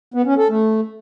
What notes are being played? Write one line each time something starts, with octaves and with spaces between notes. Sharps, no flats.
B3
C#4
A4
A3